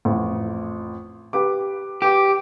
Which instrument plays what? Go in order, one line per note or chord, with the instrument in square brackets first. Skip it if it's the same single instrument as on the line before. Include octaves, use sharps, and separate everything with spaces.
[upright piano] A1 F2
G4 B4 D6
[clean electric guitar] G4 [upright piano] B4 D6